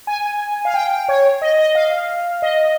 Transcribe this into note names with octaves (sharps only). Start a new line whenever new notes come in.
G#5
F5
G5
G5
C#5
D#5
D#5
F5
D#5